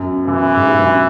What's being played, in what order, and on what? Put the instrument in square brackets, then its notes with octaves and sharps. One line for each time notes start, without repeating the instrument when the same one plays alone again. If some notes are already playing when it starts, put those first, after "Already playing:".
Already playing: [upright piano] F#2
[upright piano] F#2 [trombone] E3
[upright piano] G#2
G2
F#2